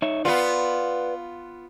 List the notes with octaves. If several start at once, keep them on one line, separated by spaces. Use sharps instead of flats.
D#4 C#5 E5
B3 F4 B4 D5 F#5